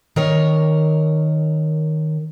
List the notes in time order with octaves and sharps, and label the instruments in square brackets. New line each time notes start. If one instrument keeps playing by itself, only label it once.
[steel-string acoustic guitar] D#3 A#4 C#5